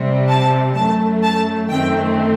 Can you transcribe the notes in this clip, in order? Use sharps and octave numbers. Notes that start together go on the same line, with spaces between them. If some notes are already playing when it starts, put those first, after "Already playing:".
Already playing: C3 G3 C4
A5
F#2 F#3 A3 A5
A5
F#2 D#3 A3 C4 G5